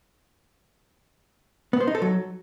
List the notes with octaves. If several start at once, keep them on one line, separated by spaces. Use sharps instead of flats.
B3
C5
D#4
A4
F#3